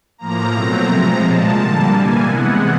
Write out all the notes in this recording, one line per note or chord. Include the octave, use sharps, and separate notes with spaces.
A2 F3 A#3 A#5
B2 F#3 A3 C4
C3 F3 G#3 A#5
A#2 F3 G#3 A5
D3 G3 A#3 A5
E3 G3 A#3 G#5
C3 E3 G#3 B3 F#5